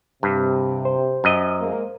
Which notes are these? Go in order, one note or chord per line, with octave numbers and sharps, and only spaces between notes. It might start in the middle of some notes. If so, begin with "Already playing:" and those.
G2 C3
C5
F#2 D#5
G#3 A#3